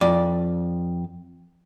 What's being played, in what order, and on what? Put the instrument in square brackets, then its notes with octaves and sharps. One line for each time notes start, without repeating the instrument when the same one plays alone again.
[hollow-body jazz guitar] F2 D5